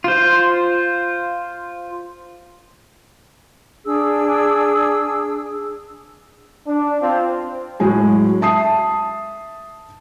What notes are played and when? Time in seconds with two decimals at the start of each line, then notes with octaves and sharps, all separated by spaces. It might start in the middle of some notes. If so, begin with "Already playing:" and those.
0.04 F4 C5
3.85 D4 G#4 E6
6.68 D4
7.01 C4 F4
7.80 A2 F#3 G#3 G#4
8.41 E5 A5 D#6 C7